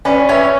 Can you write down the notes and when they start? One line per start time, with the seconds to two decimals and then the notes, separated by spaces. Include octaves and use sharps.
0.05 C#4 B4 D5
0.29 C#4 C#5 E5